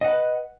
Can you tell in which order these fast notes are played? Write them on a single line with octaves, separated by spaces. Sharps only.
D#5 F#5 B4